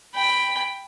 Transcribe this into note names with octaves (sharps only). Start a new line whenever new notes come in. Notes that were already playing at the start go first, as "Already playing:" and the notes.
G5 B5